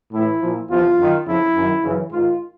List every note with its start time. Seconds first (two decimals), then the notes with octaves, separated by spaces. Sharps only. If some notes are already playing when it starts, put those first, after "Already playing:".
0.12 A2 E3 E4
0.40 A#2 F3
0.69 E2 C3 F3 F4
0.97 F#2 D#3
1.26 F2 C#3 F3 E4
1.55 F#2 D#3
1.83 F#2 C#3 E3
2.12 G#2 D#3 F4